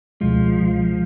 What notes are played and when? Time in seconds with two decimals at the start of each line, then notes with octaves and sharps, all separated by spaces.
0.21 C#2 B2 F3 G#3